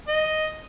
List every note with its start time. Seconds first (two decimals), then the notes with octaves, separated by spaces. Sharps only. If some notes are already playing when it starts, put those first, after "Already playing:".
0.08 D#5